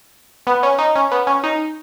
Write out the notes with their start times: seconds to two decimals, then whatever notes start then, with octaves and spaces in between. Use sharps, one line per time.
0.47 B3
0.63 C#4
0.78 D#4
0.95 C#4
1.12 B3
1.27 C#4
1.43 D#4